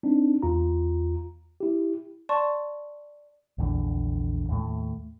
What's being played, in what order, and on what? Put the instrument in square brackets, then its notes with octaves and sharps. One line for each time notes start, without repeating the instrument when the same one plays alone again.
[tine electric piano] C4 D4 D#4
E2 F4 A#5
E4 G4
[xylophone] D5 A5 C6 C#6
[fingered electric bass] A#1 E2 D3
D#2 A2 A3